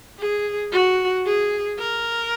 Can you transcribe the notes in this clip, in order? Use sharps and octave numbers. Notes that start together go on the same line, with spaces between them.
G#4
F#4
G#4
A#4